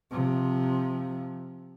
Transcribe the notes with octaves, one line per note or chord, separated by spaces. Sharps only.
C3 F3